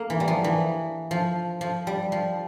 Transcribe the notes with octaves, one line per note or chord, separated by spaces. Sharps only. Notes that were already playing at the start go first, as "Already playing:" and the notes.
Already playing: A#3
E3
G3
F3
E3
F3
F3
G3
F3